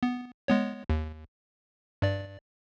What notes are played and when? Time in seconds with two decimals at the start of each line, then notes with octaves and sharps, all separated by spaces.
0.03 B3
0.48 G#3 B3 C#5
0.90 D#2
2.02 G2 D5